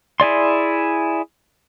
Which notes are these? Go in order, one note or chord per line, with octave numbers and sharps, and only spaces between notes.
E4 G#4 D5 C6